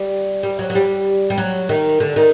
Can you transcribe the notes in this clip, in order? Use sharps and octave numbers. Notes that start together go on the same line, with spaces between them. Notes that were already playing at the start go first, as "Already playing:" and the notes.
Already playing: G3
G3
F#3
F#3
G3
G3
F#3
D#3
D3
D#3